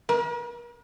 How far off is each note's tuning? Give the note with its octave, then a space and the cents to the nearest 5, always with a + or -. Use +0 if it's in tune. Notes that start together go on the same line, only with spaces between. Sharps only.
A#4 +45